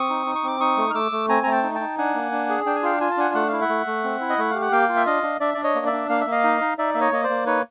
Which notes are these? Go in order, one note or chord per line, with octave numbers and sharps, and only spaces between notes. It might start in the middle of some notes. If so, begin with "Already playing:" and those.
Already playing: C4 C#6 D#6
D#4
D#4
C#6
C4 D6
D#4 C#6 D#6
A3
F6
A3 D6 E6
A3
C4 G#5 A#5
A3 A#5
G5 A5
D#4
G5 A5
D#4
D4 F#5 G#5
A#3
D4
G#4
D4 G5
G#5
F4 F5 G5
F4 G#5
A5
D4 F#5 G#5
A3 F#5
E4 F5
E5 F#5
A3
A3
C4
E4
D#5
A3 E5
G4 F5
F#5
A#3 F5 G5
F4
E5
D4 D#5 F5
D4
D4 D5 E5
D4 D5
C#5 D#5
A#3
D5 E5
D4
A#3 F5
E5
A#3
D#5 F5
D#4
D#4
D#4 D5 E5
A#3 E5
C#5 D#5
A#3 D#5
C5 D5
A#3
D#4 B4 C#5